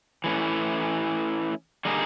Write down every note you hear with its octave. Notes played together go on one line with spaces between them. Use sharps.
E3 A3 C#4 E4
D3 G3 A#3 D#4 G#4